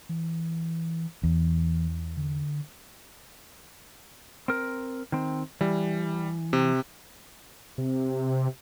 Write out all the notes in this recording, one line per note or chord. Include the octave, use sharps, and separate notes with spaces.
E3
E2 E3
D3
C4 A#4
D#3 C4
E3 G3
C3
C3